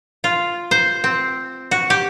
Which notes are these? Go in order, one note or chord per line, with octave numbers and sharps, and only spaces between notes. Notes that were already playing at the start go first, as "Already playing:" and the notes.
F4
C5
C4
F#4
G4